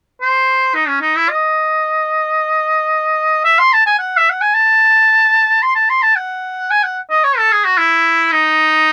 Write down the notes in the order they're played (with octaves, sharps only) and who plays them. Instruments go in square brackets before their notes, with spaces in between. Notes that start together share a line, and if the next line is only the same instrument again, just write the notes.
[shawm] C5
D#4
C#4
D#4
E4
D#5
E5
C6
A5
G#5
F#5
E5
F#5
G#5
A5
C6
A5
C6
A5
F#5
G#5
F#5
D#5
C#5
A4
G#4
F#4
E4
D#4